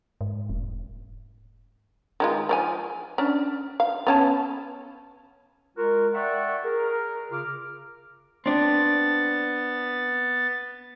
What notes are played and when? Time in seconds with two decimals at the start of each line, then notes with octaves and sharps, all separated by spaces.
0.21 G#2
0.49 E1
2.20 D#3 G#3 F4
2.49 F3 D5 G#5
3.18 C#4 D4
3.80 F5
4.07 B3 C#4 A5
5.77 G#3 F4 F#4 A#4
6.14 D5 E5 F#5 G5 C#6
6.64 G#4 A#4
7.31 C#3 F4 D6 F6
8.46 B3 C4 D4 A6